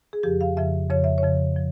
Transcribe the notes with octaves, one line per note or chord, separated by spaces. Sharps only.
G#4
F2 C#3 F3 G4
F5
F2 C#3 F3 E5
F2 C#3 F3 C#5
E5
C#5
F2 C#3 F3
F3